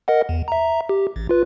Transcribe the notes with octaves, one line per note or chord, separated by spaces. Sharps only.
A#4 D#5 F#5
E2
E5 A#5
G4
A1
F4 B4